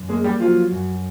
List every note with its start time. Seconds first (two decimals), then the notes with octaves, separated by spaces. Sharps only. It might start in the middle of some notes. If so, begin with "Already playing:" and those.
Already playing: F#2
0.09 G#3 A#3 G#4
0.24 G3 G4
0.40 F3 F#3 F4
0.72 F#2